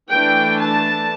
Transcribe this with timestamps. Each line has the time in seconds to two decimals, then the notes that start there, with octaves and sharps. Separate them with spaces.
0.10 E3 A3 D4 G5
0.60 A5